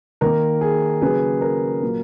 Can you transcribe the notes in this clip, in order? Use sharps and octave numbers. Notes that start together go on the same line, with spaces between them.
D#3 A#3 A#4
G#4
C#3 F#3 A#3 G#4 B4
A#4
A#2 F#3 A#3